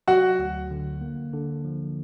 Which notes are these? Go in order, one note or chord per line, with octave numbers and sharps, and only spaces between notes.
F#3 F#4 F#5
D2
D3
A#3
D3
F3